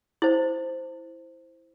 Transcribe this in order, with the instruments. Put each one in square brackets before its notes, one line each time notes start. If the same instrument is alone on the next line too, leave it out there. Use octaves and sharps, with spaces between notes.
[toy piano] E4 C5